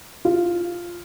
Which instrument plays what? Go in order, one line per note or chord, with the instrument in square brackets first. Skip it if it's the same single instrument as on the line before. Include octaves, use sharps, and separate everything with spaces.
[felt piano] F4